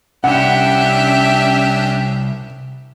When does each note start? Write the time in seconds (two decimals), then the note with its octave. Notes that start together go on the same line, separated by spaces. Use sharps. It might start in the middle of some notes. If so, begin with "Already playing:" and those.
0.24 C2 C#4 D4 G4 E5 F#5